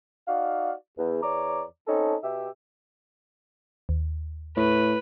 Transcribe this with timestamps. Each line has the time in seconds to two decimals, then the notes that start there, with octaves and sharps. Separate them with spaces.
0.28 D#4 F#4 D5 F5
0.98 E2
1.23 E2 C#5 D5 A#5 D6
1.87 C4 C#4 D#4 A4
2.23 B2 G4 E5
3.89 D#2
4.57 A2 B4